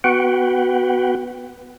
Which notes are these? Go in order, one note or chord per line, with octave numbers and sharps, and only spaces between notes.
B3 F#4 B4 F#5 G5